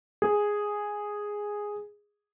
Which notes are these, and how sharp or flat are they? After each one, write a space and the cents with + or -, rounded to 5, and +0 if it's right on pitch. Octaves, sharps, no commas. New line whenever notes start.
G#4 -5